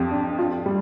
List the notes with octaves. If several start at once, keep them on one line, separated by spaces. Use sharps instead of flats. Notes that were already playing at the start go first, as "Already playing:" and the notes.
Already playing: F2 F3 G4
D4
F4
G3